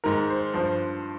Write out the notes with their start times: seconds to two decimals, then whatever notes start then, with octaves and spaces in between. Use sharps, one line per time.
0.04 G#2 D#3 A#4
0.29 C5
0.54 G2 F3 C5